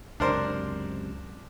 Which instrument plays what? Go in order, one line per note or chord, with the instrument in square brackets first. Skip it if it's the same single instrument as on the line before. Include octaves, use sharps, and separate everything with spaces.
[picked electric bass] C#2 F#2 C3 [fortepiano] D4 A#4 C5